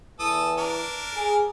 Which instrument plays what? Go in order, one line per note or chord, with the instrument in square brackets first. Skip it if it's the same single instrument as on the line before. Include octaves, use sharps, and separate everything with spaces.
[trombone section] E2 E3 [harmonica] A4 D#6
[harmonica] D4 A#4
[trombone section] G#4